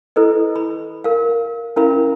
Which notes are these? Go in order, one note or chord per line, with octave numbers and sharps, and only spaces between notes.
E4 A4 B4 D#5
B5
A#4 F5
C#4 E4 A#4 E5 F5 B5